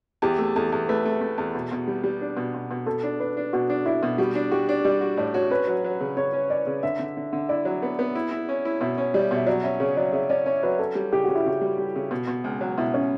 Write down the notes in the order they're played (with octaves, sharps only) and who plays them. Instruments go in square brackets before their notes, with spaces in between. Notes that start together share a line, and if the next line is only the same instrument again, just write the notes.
[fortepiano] E2 [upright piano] G4
[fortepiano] A3
[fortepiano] E2 [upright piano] A4
[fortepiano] E2
[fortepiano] A3 [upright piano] B4
[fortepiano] A3
A3
E2
B2
B2
G3
G3
D4
B2
B2
B2
[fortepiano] B2 [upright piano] A4
[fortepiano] D4
[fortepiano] D4 [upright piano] B4
[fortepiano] D4
[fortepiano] B2 [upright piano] F#4
[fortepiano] D4
[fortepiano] D4 [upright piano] E4
[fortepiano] B2
[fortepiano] G3 [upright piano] F#4
[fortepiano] D4
[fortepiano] F#4 [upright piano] G4
[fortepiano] D4
[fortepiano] G3 [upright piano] D5
[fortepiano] F#4
[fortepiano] A2 [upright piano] D5
[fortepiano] F#4 [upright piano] C#5
[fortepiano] C#4 [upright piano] B4
[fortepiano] F#3
F#3
C#3
[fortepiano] C#3 [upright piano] C#5
[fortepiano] C#4
[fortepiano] C#4 [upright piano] D5
[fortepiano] C#3
[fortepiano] D3 [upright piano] E5
[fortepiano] D3
D3
D3
[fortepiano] E4 [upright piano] D5
[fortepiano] F#3
B3
B3
E4
E4
C#4
E4
[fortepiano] B2 [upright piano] E5
[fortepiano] C#4
[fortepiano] G3 [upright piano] D5
[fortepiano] B2
[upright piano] E5
[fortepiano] F#3 [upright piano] D5
[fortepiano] C#4 [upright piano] E5
[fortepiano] C#3 [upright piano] C#5
[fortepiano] F#3 [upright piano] D5
[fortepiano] C#3 [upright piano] E5
[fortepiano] C#4 [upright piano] D5
[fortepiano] C#4 [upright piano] C#5
[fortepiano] F#3 [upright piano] B4
[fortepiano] C#4 [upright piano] A4
[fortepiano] G3
[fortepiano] C#3 [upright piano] G4
[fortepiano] C#3 [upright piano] F#4
[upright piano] E4
[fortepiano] C#3 [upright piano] F#4
[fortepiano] G3
G3
C#3
B2
B2
C#2
F#3
[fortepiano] B2 [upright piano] E4
[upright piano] C#4